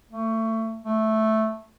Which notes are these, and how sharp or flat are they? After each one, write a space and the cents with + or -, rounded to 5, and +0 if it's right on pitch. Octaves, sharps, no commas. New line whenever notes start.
A3 +25
A3 -5